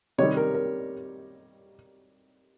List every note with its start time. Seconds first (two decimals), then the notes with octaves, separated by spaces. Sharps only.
0.18 C3 D#3 G3 C#5
0.37 A#4
0.54 A#4